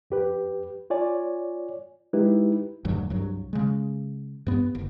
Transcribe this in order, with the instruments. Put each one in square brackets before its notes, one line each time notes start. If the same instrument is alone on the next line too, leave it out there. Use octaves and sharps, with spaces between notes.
[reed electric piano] F2 G4 B4
F4 C#5 D5 G#5
G#3 D#4 E4 G4 B4
[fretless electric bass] E1 D2 G2 F#3
C2 G2 F#3
C#3 G#3
G2 B3
F#1